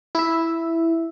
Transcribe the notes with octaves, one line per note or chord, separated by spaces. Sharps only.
E4 E5